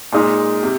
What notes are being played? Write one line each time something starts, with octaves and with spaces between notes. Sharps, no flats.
A#2 G#3 D#4
C3